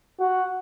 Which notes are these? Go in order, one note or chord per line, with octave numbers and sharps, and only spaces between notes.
F#4